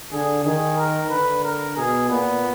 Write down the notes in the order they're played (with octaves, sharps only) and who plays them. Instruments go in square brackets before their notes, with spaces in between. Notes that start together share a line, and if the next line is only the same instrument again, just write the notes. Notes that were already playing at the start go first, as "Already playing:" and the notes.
[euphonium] D3 [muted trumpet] G#4
[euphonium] D#3 [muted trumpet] G#4
[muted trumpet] A#4
[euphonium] D3 [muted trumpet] B4
[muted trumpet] A#4
[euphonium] B2 [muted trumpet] G#4
[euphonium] A#2 [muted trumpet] B3